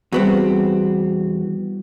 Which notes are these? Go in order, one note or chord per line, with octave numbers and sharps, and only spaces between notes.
E2 G3 B3 C4 F#4